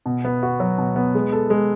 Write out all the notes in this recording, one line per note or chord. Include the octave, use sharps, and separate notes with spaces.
B2
B3
F#4
F#3
B2
B3
G#3
A4
G#3